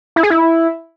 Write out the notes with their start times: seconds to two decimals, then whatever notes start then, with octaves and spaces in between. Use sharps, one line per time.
0.16 E4
0.23 G#4
0.30 E4